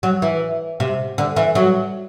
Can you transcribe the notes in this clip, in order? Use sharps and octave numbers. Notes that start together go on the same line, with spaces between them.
F#3
E3
C3
D3
E3
F#3